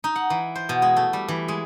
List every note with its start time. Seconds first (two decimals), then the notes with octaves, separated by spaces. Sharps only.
0.04 D#4
0.16 F#5
0.30 E3
0.55 C5
0.69 B2
0.82 G#3
0.96 A3
1.13 G3
1.28 E3
1.48 G#3